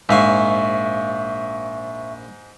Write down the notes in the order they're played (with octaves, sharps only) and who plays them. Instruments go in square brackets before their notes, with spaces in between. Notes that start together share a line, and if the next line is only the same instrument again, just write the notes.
[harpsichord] A#1 F5 G#5 [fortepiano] G#2 [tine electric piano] E5 C#6